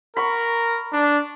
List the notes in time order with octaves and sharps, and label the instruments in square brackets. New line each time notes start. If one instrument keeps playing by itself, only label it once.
[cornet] A#4 [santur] B5 C#6
[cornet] D4